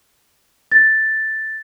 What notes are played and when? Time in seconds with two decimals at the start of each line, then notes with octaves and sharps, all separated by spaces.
0.72 A6